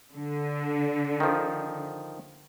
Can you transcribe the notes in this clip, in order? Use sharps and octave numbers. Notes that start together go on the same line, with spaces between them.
D3
D#3 F3